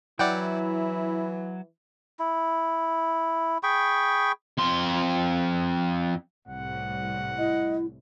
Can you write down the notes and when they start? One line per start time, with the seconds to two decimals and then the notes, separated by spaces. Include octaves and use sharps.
0.19 E3 F#3 E4 D5 F#5 G5
2.19 E4
3.63 G#4 G5 B5 C#6
4.58 F2 C6
6.48 C2 A2 F#5
7.38 E4 D#5